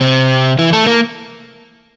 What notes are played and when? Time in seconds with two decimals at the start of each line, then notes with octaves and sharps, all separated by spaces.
0.01 C3 C4
0.59 E3 E4
0.73 A3 A4
0.86 A#3 A#4